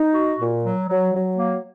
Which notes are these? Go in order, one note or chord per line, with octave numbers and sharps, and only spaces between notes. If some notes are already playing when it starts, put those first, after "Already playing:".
Already playing: D#4
F#4
A#2
F#3
F#3
F#3
A#3